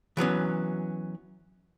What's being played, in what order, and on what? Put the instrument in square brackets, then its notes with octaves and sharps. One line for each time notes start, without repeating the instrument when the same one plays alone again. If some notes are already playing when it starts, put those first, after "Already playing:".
[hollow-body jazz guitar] E3 F#3 B3 C#4